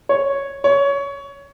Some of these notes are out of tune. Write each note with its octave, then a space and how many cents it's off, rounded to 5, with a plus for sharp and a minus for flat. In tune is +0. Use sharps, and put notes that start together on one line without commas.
C#5 -5
C#5 +15